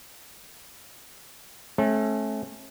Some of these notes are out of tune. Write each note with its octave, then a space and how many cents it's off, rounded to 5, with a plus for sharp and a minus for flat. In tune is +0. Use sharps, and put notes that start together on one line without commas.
A3 -25 C#4 -40